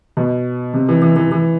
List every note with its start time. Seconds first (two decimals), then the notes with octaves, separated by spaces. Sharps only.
0.17 B2
0.74 C3
0.89 E3
1.02 E3
1.16 E3
1.32 E3